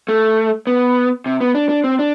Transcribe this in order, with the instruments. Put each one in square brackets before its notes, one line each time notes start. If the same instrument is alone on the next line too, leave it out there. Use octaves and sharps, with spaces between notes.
[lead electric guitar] A3
B3
C3
B3
D4
D4
C4
D4